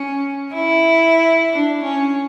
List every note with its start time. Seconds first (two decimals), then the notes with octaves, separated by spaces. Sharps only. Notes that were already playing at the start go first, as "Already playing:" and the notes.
Already playing: C#4
0.54 E4
1.52 D4
1.84 C#4